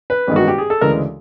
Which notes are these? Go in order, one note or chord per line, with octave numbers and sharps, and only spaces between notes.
B4
A1 G2 D#3 G#3 B3
F#4
G4
G#4
A4
D2 C#3 E3 G#3 A#4